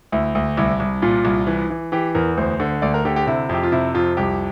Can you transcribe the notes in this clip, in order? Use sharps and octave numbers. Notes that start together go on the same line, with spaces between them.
D2 E4
D2
C2 E4
C2
A#2 F4
C2
E3
E3
E3 G4
E2 A#4
D2 C5
D3
D2 D5
A#4
D3 G4
G4
C3 E4
F2 G4
F4
C3 E4
F2 F4
C2 G4